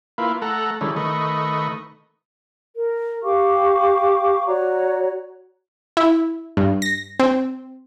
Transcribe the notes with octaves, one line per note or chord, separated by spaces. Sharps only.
A#3 E4 F4 B4
A3 A4 F#5 A#5
D#3 G3 G#3 C#4 E4 A4
D#3 A3 B4 D#5 C#6
A#4
G4 F5 C#6 D6
F#4 C#5 D5 A#5
E4
G2
A#6
C4